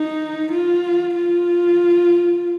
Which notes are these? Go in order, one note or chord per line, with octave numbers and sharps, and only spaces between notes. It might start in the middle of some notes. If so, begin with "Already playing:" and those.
Already playing: D#4
F4
F4